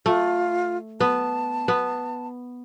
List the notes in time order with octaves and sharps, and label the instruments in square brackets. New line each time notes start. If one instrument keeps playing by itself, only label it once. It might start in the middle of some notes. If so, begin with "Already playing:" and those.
[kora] A3 [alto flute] F4
[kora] B3 [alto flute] A5
[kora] B3